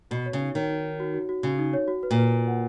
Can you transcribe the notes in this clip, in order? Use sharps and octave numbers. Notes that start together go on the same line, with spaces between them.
B2 F#4
C#5
C#3
D#4
D#3 C#5
D#4
D#4
F#4
F#4
F#4
C#3 F#4
D#4
C#5
F#4
B4
A#2
B4
B4
F#5